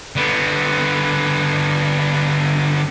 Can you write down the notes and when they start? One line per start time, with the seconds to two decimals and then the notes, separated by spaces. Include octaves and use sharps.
0.16 D3 B3